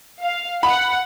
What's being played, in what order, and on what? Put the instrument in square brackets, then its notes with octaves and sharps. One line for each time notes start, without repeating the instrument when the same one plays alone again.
[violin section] F5
[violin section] F#5 [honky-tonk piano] B5